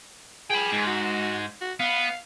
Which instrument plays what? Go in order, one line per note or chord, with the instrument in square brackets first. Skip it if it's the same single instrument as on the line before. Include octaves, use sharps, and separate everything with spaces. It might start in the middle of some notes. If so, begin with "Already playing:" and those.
[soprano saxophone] G#4 [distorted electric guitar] G5 B5
[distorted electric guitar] G#2
[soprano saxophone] F#4
F#4
[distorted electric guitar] B3 [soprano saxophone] F5